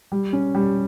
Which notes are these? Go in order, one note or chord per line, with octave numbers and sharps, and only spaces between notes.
G3
C#4
G3